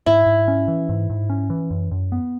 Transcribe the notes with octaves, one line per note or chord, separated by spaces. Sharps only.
G#2 E4
G#2
C#4
E3
G#2
G#2
C#4
E3
F#2
F#2
B3